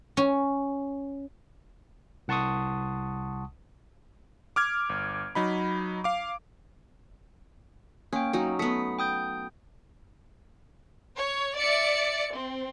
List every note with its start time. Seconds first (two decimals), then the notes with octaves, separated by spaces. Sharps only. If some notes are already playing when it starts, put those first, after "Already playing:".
0.17 C#4
2.28 C2 F#5 A5 C6 C#6 D#6
4.56 D6 F6 G#6
4.89 G1
5.35 F#3 D#4 B5
6.04 F5 D6
8.13 A#3 C#4 G5
8.33 F#3 C#4 D#4
8.59 A3 B3 D#6 B6 C#7
8.99 G5 D#6 G6
11.16 C#5
11.56 D5 E5 C#7
12.33 C4